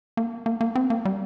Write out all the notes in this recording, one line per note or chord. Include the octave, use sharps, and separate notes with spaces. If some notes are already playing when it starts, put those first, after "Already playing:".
A#3
A#3
A#3
C4
A#3
G3